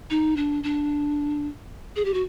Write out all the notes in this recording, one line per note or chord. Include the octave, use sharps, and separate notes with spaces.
D#4
D4
D4
G#4
G4
F#4